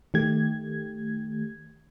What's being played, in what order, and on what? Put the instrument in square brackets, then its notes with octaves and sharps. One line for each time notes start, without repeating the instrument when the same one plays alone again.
[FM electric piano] D#3 A3 G4 G#6